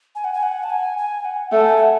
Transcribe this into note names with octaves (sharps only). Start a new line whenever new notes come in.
G#5
F#5
G#5
F#5
A5
G#5
G#5
F#5
A3 A5
G#5
F#5